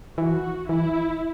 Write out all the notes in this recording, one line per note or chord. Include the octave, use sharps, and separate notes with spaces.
E3 F#4
E3 E4